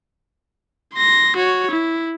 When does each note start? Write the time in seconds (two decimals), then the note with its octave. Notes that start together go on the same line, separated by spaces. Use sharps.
0.95 C6 A#6
1.36 F#4 C#5
1.71 E4